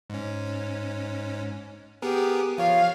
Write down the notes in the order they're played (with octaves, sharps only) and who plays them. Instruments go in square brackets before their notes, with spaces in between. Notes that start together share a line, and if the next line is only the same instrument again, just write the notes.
[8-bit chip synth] G#2 C#4
[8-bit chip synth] B3 G#4 A#4 [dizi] G4
[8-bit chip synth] F3 C#5 [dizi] F5